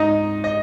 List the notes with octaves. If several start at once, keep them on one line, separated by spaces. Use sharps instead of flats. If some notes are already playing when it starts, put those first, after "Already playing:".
Already playing: G#2 D#4 D#5
D#5